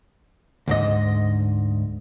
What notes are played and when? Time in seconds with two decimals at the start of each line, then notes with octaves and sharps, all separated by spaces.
0.68 D2 G#2 D#5